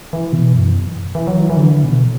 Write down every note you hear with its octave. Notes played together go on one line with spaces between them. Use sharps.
E3
B2
F#2
E3
F#3
E3
E3
D3
B2